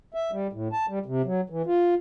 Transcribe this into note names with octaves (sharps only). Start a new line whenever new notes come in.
E5
G3
A2
A5
G3
C3
F#3
E3
F4